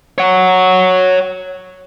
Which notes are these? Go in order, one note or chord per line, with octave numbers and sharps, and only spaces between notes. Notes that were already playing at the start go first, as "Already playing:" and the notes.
C#5 F#5